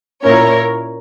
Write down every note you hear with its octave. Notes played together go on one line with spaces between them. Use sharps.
A#2 A#3 C#4 E4 A#4 C#5